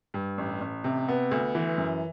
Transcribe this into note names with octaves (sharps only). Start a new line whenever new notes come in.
G2
A1
A1
C3
B3
D2
E3
F#2